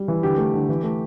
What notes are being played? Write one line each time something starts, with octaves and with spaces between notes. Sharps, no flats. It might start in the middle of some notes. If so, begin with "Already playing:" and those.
Already playing: G3
E3
D3 G4
A3
D3
E3
A3